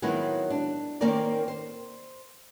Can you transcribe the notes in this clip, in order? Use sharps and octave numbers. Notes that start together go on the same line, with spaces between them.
D#3 F#3 G#3 B3 C4 E4
D4
D#3 A#3 C4 C#4 A#4 D5
C5